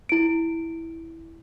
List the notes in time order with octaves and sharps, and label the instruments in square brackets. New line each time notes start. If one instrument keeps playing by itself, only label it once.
[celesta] E4 D7